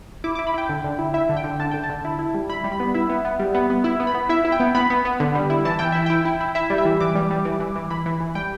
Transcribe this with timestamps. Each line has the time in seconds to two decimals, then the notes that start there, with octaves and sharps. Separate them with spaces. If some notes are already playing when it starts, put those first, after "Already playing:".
0.24 E4 D6
0.35 E4 D6
0.47 B5
0.54 E4 G5
0.69 D3
0.84 D3
0.99 E4
1.14 E4 E5
1.29 D3
1.37 G5
1.44 D3
1.60 D3 A5
1.71 D3 G5
1.84 A5
1.90 D3
2.05 E4
2.19 E4
2.34 G3
2.49 E4 B5
2.64 G3
2.72 B5
2.80 B3
2.94 E4 E5
3.09 B3
3.25 B3
3.39 G3
3.54 B3
3.70 B3
3.84 E4
4.00 B3
4.07 B5
4.14 B3
4.29 E4 E5
4.45 E4
4.52 G5
4.60 B3
4.75 B3 B5
4.90 B3
5.05 B3
5.20 D3
5.35 G3
5.50 E4
5.65 E3 A5
5.79 E3 G5
5.92 E4 E5
6.06 E4 G5
6.25 E4
6.41 E4
6.55 E4 E5
6.70 G3
6.78 E5
6.85 E3
7.00 E3 D6
7.15 G3
7.31 G3
7.45 E3
7.60 E3
7.76 E3
7.90 E3 B5
8.06 E3
8.20 E3
8.35 G3 G5